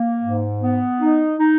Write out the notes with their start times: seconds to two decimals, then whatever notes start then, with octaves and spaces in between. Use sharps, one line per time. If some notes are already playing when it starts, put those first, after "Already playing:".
Already playing: A#3
0.22 G#2
0.62 B3
1.01 D#4
1.40 D#4